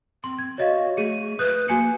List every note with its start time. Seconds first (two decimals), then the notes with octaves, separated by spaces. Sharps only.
0.24 C4 C6
0.39 G#6
0.58 F#4 C#5 D#5 F5
0.97 A3 G#4 D#7
1.39 B4 D#6 F#6 G6
1.68 A#3 F#4 G#5 C#7